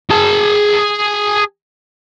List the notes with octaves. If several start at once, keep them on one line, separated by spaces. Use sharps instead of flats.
G#4 A5